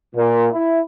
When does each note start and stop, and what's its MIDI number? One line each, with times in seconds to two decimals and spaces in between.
0.15 0.46 46
0.52 0.79 64